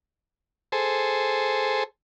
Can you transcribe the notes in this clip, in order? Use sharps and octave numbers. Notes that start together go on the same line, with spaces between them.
G#4 A4 C5